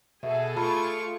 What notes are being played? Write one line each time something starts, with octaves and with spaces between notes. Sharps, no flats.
B2 G#4 A4 E5 G#5
A3 F4 A5 B5 C#6